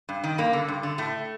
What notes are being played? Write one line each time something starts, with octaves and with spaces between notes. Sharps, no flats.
G2
D#3
G2 A#3
D3
G2
D3
A2 A3